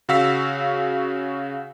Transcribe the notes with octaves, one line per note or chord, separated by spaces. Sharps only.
C#3 F#4 F5 E6 B6